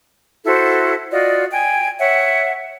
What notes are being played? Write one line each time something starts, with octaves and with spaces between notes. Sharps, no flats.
E4 F#4 A4 C5
F4 F#4 D5 D#5
G5 G#5
C#5 E5 F#5